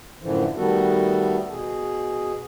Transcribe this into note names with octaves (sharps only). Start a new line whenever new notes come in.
F#2 A2 D3 E3 F3
D#3 G3 A3 B3 F#4 A4
B2 G#4